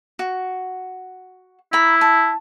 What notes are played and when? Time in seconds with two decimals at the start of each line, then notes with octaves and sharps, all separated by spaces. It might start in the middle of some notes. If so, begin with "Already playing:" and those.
0.19 F#4
1.73 E4 A#5 B5
2.01 A5